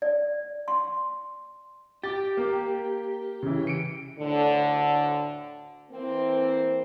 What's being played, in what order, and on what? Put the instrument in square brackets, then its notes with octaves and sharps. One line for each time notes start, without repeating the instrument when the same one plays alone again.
[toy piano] D5
C6
[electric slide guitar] G4 [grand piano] D6 A6
[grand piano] A#3
C#3 E3
C#7 D7
[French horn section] D2 A2 D3
E3 A#3 C4